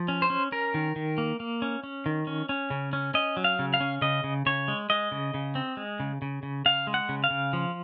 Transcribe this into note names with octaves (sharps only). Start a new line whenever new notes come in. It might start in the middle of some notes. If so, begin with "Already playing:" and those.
Already playing: F3
C#4
C5
C#4
C#4 A#4
D#3
D#3
A#3
A#3
C#4
C#4
D#3
C#4
C#4
C#3
C#4
C#4 D#5
F#3
F5
C#3
F5
C#4
C#3 D#5
C#3
C#3 C#5
G#3
G#3 D#5
C#3
C#3
C4
G#3
C#3
C#3
C#3
C#3 F5
G#3
F#5
C#3
F5
C#3
F3